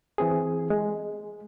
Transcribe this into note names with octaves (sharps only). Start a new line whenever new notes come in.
E3 C4 G#4
G#3